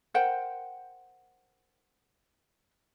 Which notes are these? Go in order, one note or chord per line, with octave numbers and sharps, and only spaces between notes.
A#4 C5 F#5 G5